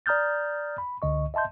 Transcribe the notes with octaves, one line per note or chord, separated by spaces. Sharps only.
D5 A#5 D#6 F6 G6 A6
B5
C#2 D3 D#5 C#6
D#5 E5 A5 C6 G6